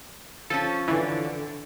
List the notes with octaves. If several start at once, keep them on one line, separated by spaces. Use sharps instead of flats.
F3 C#4 A4
D3 E3